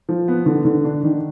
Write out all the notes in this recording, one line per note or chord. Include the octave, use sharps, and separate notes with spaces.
F3
B3
D3
D3
D4
D#3